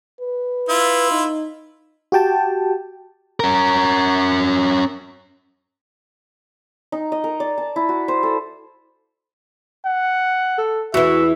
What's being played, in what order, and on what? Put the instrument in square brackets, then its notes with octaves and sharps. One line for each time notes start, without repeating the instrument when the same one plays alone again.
[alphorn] B4
[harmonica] E4 F4
[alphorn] D#4
[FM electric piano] F#4 G4 G5 A5
[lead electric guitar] C#4 A#4
[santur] D#4
D#5
A#4
D5
A5
E4
F#4
C5
A4
[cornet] F#5
[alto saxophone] A4
[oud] E2 E3 [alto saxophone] F#4 [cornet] E5